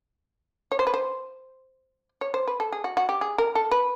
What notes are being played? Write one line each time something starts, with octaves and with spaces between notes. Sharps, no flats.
C#5
C5
B4
C5
C#5
C5
B4
A4
G#4
F#4
F#4
G4
G#4
A#4
A4
B4